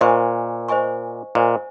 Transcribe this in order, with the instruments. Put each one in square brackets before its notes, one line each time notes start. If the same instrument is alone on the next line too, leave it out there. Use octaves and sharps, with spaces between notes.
[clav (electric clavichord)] A#2 [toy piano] C5 D#5 G#5 C#6
[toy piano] C5 D#5 G#5 C#6
[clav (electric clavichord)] A#2 [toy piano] C5 D#5 G#5 C#6